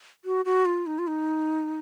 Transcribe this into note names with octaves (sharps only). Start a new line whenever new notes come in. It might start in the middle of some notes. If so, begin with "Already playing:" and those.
F#4
F#4
F4
D#4
F4
D#4